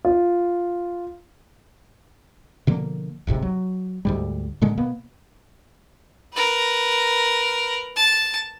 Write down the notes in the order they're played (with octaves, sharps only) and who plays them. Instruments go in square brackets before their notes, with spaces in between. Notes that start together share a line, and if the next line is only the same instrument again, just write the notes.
[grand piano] F4
[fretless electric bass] B2 D3 F3 A#3
D1 G#1 G#2 C3
F#3
D2 G#2 G3
A2 D3 G#3 A#3
B2 A#3 B3
[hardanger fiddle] A#4 B4
A5